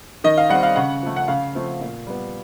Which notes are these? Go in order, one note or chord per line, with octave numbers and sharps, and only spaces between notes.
D#3 D#5
F5
G3 C4 F#5
F5
C#3 F#5
F3 A3
F#5
C#3 F5
F3 A3 C4
A#2
G3 B3